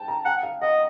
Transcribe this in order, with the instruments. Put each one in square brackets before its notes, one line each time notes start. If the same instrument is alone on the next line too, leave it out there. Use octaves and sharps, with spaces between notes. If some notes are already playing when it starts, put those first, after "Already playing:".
Already playing: [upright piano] G5 A5
A#5
[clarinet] F#5 [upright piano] G5
[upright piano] F5
[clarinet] D#5 [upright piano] F#5